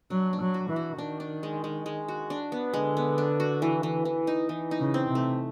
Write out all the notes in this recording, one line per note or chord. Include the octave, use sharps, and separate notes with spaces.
F#3 D4
D4
F#3
F#4
E3
F#4
D#3 D4
D4
G#3
G#3
G#3
F#4
D4
B3
D3 G#3
B3
D4
F#4
E3
E3
E3
D#4
E3
D#4
C#3
C4
C3
A3